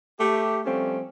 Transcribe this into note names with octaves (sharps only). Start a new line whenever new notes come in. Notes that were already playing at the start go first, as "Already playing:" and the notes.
A3 G4
F3 G3 A3 C4 C#4